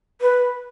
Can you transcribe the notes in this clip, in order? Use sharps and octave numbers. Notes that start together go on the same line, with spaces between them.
B4